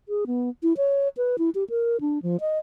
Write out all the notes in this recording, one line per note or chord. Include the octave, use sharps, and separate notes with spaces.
G#4
B3
E4
C#5
B4
E4
G4
A#4
D4
F3
D#5